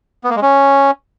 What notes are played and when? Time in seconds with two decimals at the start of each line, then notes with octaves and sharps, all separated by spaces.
0.24 B3
0.30 A#3
0.36 G#3
0.42 C#4